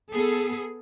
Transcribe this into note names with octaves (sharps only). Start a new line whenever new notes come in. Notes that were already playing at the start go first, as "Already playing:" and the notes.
B3 G#4 A4